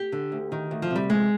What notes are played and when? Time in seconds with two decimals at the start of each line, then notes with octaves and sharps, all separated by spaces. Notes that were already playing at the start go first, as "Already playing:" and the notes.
Already playing: G4
0.12 D3
0.32 D2
0.52 D#3
0.71 D2
0.82 F3
0.90 C3
0.96 G3
1.10 F2 G#3